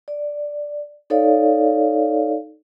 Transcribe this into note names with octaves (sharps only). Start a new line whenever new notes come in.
D5
D#4 A4 C#5 D5 F5